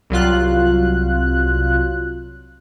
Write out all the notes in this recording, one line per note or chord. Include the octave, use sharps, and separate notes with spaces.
C2 F#3 F4 F#6